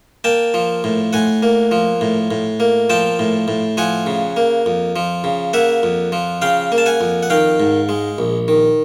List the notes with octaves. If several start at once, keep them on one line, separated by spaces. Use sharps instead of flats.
A#3 G5 A5
F3
A2
A2 F#5 G#5
A#3
F3
A2
A2
A#3
F3 G5 A5
A2
A2
F3 F#5 G#5
C#3
A#3
F2
F3
C#3
A#3 E5 F#5
F2
F3
C#3 F5 G5
A#3
A5
F#5 G#5
F2
F#5
D#3 F5 G5
G#2
G#3
A#1
D#3